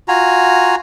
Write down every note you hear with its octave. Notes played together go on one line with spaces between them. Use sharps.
F4 F#4 G#5 A#5